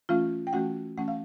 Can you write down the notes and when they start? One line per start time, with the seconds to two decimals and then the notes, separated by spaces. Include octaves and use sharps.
0.09 E3 A3 C#4 F4 F5
0.47 G5
0.53 E3 A3 C#4 F#4 F#5
0.97 E3 A3 C#4 F#5
1.08 F5